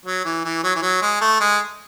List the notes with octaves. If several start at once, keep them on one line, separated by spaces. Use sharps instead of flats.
F#3
E3
E3
F#3
E3
F#3
G#3
A3
G#3